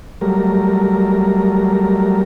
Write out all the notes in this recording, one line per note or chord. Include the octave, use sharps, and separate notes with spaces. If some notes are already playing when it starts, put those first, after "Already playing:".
F#3 G3 A3 A#4